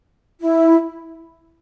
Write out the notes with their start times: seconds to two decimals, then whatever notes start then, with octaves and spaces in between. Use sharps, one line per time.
0.41 E4